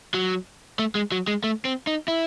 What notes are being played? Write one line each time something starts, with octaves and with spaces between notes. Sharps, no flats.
F#3
A3
G#3
F#3
G#3
A3
C4
D#4
E4